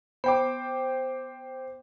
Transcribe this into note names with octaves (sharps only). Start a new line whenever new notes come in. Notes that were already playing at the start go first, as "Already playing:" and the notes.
B3 C5 G5 D6